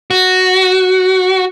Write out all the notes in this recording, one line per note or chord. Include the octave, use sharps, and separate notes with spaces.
F#4